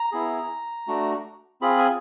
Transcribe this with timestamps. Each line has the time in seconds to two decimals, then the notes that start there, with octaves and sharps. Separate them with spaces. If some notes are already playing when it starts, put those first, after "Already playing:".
Already playing: A#5
0.12 B3 E4 G#4
0.88 A3 D4 F#4
1.61 C4 F4 G#4 B5
1.79 G#5